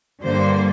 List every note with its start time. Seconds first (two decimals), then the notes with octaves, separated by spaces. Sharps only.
0.23 G2 D3 G3 A#3 C5